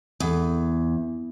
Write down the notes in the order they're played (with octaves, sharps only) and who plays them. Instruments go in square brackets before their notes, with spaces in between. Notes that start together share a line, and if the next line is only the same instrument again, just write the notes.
[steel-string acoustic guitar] E2